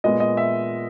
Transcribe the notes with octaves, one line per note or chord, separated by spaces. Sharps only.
A#2 G#3 B3 D#5
D#5
E5